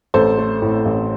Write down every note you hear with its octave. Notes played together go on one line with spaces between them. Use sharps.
A1 A4 C5
A3
A2
A1